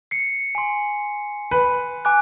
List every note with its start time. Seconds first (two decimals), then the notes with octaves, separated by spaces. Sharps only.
0.11 C7 C#7
0.55 G#5 C6
1.51 B4
2.05 G#5 D6 F#6